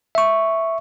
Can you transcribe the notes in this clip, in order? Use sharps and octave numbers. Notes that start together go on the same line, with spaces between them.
E5 C#6